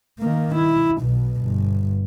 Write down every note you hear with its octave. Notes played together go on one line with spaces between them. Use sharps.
D#3 A#3
E4
B1 B2
G1